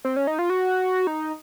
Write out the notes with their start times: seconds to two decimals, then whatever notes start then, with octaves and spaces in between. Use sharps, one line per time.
0.05 C4
0.16 C#4
0.27 D#4
0.39 F4
0.50 F#4
1.07 D#4